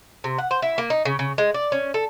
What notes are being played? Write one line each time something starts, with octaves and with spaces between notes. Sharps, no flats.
C3
F#5
C5
E4
A#3
D#4
C#3
C#3
G#3
D5
C#4
A4